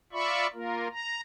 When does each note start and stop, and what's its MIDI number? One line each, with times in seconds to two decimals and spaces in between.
0.13 0.47 65
0.13 0.47 74
0.13 0.47 76
0.13 0.47 83
0.13 0.47 85
0.54 0.88 58
0.54 0.88 65
0.54 0.88 70
0.91 1.21 82